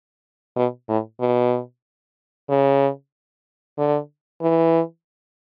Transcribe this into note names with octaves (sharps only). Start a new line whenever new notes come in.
B2
A2
B2
C#3
D3
E3